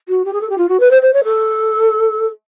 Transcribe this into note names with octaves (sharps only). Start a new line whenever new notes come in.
F#4
G4
G#4
A4
G4
F4
F#4
B4
C5
C5
C#5
A4